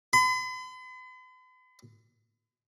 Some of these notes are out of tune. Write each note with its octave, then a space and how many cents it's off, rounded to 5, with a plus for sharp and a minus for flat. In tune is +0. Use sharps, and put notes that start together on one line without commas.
B5 +45